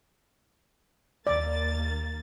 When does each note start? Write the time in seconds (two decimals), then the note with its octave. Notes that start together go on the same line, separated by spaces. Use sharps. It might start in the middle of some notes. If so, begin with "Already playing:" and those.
1.27 D#2 A#3 D5 A6